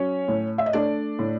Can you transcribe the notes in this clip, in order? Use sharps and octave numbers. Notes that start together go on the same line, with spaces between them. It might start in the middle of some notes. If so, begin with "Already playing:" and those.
Already playing: F#3 C#4 C#5
A2
E5
D#5
A3 D4 D5
A2